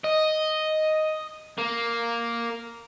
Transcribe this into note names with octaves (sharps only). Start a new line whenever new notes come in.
D#5
A#3